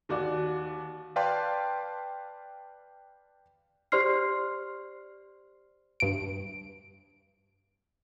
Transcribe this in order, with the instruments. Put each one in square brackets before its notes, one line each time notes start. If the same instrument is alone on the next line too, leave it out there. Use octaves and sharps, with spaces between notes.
[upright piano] D#2 F#4 D5
[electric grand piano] B4 D5 F5 G5 A5 C6
[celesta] G4 C5 D5 C6 F6 C7
[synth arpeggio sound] G2 D7